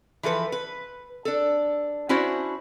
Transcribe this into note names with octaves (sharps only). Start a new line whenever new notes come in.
E3 F3 A4 B4
B4
D4 A4
C#4 D4 E4 F#4 C5